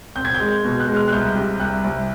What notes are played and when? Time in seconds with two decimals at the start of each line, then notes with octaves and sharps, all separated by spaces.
0.15 C4 G6
0.25 G#6
0.34 G6
0.39 G#3
0.64 B2
0.80 F#6
0.88 G#3
0.96 F6
1.08 F#6
1.12 C2 G6
1.35 C3
1.60 C2 F#6
1.84 C2